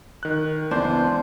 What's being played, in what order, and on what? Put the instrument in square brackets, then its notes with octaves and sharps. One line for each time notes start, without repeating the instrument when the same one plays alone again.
[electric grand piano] D#3 F#6
[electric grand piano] C#2 E3 [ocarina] B3 [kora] D4 [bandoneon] C5